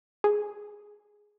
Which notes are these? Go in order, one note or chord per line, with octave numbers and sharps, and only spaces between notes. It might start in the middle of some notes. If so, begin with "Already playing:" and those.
G#4